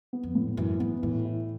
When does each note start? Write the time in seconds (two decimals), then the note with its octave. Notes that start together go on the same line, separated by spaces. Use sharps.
0.13 B3
0.23 F2
0.35 A2
0.57 F#2 E3
0.80 G#2 B3
1.03 A2 E3
1.25 E4